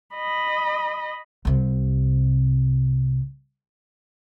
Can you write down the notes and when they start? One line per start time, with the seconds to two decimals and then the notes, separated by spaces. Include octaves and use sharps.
0.15 D#5 B5
1.45 C2 C3